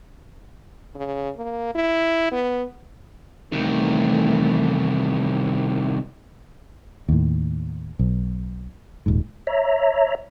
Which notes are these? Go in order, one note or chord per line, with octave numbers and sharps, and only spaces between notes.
C#3
A#3
E4
B3
C2 D#3 E3 A3
D#2 A2
B1
D#1 G#2
C#5 E5 A#5